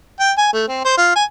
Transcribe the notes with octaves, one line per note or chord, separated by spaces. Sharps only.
G5
G#5
A3
C4
C5
F4
G#5